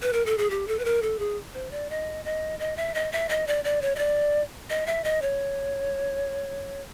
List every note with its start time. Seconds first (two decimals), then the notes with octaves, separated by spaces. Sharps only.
0.02 B4
0.13 A#4
0.26 A4
0.38 G#4
0.50 G4
0.67 A4
0.79 B4
0.85 A#4
1.02 A4
1.19 G#4
1.54 C5
1.71 D5
1.90 D#5
2.25 D#5
2.59 D#5
2.76 E5
2.94 D#5
3.12 E5
3.29 D#5
3.47 D5
3.64 D5
3.82 C#5
3.96 D#5
3.99 D5
4.70 D#5
4.87 E5
5.04 D#5
5.22 C#5